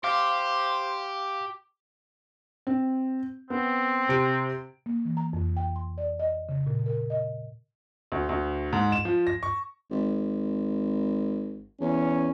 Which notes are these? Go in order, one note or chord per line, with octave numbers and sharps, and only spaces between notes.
G4 C5 F5 D6
C4
B3 C4
C3 D7
A#3
E3
A#5
F2
G5
C6
D5
D#5
C#3
A#2
A#4
D#5
D2
D2
G#2
E7
F3
A#6
C#6
G#1
E2 C#4